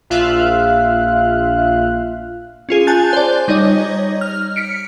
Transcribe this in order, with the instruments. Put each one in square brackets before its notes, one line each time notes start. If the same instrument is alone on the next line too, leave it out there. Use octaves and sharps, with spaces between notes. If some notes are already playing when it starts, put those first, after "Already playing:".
[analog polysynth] A#1 F4 E5 F5 F#6
[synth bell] C#4 F4 G#4
G#5 A5 F#6 G6 A6
C5 D5
G3 D#4 C#5 D#5
F6
B6 C#7 D7